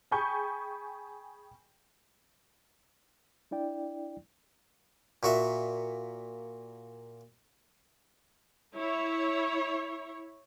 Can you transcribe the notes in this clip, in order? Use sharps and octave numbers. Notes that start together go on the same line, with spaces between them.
G#4 G5 G#5 B5 C#6 G6
D4 E4 D5 G5
A#2 F#4 E5
E4 C#5